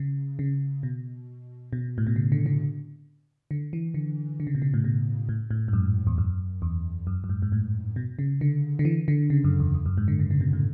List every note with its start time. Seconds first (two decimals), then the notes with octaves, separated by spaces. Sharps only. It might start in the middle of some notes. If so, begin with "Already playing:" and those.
Already playing: C#3
0.39 C#3
0.83 B2
1.73 B2
1.98 A2
2.07 B2
2.16 C#3
2.32 D3
2.46 D3
3.51 D3
3.73 E3
3.94 D3
4.40 D3
4.47 C#3
4.55 B2
4.62 C#3
4.74 A2
4.84 B2
5.29 A2
5.51 A2
5.68 G#2
5.73 F#2
6.07 E2
6.18 F#2
6.62 E2
7.07 F#2
7.24 F#2
7.29 G#2
7.42 G#2
7.52 A2
7.96 B2
8.19 C#3
8.41 D3
8.79 D3
8.85 E3
9.08 D3
9.30 C#3
9.44 F#2
9.60 E2
9.74 E2
9.86 F#2
9.98 G#2
10.08 D3
10.19 C#3
10.31 C#3
10.41 B2
10.53 A2